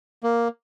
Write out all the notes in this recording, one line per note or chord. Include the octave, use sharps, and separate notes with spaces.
A#3